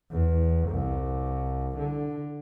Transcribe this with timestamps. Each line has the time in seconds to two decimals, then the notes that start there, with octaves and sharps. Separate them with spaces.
0.11 E2
0.70 C2
1.78 D3